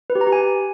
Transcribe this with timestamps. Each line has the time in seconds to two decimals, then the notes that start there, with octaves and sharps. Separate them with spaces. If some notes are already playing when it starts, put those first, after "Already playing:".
0.10 B4
0.15 G4
0.21 A#5
0.27 G4
0.33 G#5